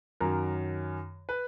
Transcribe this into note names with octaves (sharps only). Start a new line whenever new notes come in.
F#2 D#3 F#3 A#4
B4